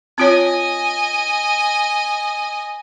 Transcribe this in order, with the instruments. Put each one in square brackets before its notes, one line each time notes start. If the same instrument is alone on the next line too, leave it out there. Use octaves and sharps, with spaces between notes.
[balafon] C4 F4 C#5 [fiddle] D#5 G#5